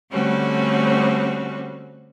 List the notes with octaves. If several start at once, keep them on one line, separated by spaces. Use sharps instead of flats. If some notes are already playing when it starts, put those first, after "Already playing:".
D3 G3 A3 C4 C#4 F#4